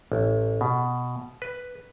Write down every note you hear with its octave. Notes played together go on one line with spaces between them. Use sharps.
A1
B2
B4